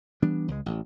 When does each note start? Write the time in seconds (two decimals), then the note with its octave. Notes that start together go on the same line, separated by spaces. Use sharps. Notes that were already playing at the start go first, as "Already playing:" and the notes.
0.22 E3 G3 B3 D4
0.48 C#2 G#3
0.66 A1